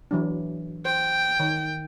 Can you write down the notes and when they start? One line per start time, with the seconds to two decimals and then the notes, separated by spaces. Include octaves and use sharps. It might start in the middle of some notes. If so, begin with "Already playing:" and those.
0.11 E3 F#3 D4
0.85 C5 G5
1.39 D#3